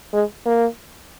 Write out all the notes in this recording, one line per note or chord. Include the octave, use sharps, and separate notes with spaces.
G#3
A#3